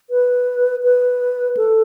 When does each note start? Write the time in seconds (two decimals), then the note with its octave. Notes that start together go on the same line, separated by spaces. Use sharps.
0.10 B4
0.83 B4
1.57 A4